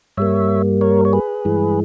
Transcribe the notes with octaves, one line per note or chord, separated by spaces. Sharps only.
G2 G3 A#3 C#5 E5
A#4 C#5
C#5
G#4 B4
G2 E3 G#3